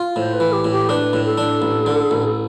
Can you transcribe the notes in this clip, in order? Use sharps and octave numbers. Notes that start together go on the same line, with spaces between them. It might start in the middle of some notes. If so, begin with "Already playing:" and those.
Already playing: F4
A2 C5
B4
E3
G4
A2
G4
D4 B4 C5
A2
A4
D4
A1
D3
A1